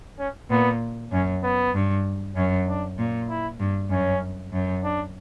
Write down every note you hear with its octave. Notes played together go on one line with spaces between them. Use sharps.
C#4
A#2 B3
F#2 C#4
B3
G2
F#2 C#4
D4
A#2
E4
G2
F#2 C#4
F#2
D4